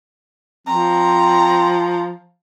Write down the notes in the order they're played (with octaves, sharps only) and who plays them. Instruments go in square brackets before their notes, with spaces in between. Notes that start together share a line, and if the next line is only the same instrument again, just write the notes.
[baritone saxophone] F3 [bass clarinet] C4 [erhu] A#5